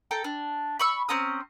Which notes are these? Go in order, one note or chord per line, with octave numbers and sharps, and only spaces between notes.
A4 G5 A#5
D4
B5 C#6 E6
C4 C#4 A#5 D#6